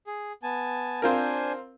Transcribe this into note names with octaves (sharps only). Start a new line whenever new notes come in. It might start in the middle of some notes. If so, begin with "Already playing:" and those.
G#4
B3 G#5 A5
C4 D4 F4 A#4 C5 G#5